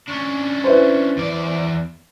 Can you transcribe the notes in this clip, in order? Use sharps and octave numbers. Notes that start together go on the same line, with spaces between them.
C#4 D4
E4 B4 C5
E2 D5